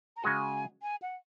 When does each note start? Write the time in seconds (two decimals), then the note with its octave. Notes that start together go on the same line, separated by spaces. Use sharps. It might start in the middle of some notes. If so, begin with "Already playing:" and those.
0.17 A#5
0.24 C#3 G#3 F#4 G#5
0.82 G#5
1.02 F#5